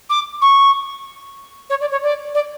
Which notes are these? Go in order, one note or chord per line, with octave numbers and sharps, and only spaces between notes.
D6
C#6
C#5
D5
C#5
D5
D5